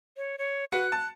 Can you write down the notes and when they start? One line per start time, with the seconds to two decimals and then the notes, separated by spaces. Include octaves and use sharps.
0.17 C#5
0.38 C#5
0.72 F#4 B4 F#6 C#7
0.92 A5